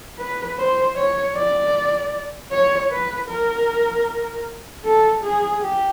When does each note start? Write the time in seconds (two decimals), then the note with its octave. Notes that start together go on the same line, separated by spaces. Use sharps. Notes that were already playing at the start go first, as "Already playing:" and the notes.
0.18 B4
0.57 C5
0.96 C#5
1.35 D5
2.51 C#5
2.90 B4
3.28 A#4
4.84 A4
5.23 G#4
5.62 G4